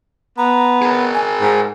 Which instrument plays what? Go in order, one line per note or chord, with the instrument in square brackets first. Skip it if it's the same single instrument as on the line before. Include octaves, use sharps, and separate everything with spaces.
[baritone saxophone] B3 [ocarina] A#5
[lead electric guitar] G#4 A#4
[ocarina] G#5
[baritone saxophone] G#2